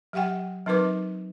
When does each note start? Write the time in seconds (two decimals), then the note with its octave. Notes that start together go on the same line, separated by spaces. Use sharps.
0.13 F#3 G4 E5 F#5 G5
0.66 F#3 C4 D#4 A#4 B4 D6